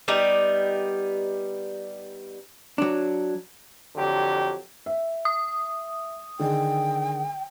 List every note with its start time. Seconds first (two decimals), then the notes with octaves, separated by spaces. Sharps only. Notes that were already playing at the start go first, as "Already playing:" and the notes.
0.08 G3 B3 D#4
2.78 F#3 D4
3.95 F2 D3 F#3 G4
4.86 E5
5.25 D#6
6.40 D3 D#3 G#4 G5